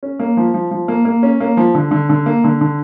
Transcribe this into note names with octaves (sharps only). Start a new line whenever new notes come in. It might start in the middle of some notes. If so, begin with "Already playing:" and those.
C#4
A#3
F3
F3
F3
A#3
A#3
C#4
A#3
F3
D3
D3
D3
A#3
D3
D3